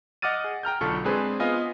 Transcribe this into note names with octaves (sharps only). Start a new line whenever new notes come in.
D#5 F#5 D6 F6 A6 D#7
G#4
G5 A#5 F6 G6
B1 D3 F4 A4 C#6
G#3 C4 D4 G#4 B4 C5
B3 F4 D#5 F5 G#5